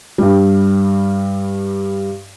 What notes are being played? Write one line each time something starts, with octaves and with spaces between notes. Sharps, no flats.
G2 G3